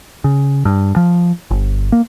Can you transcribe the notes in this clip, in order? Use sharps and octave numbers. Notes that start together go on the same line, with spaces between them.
C#3
G2
F3
G1
A#3